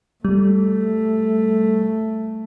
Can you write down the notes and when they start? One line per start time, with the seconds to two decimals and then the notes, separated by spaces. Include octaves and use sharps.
0.25 G3 A3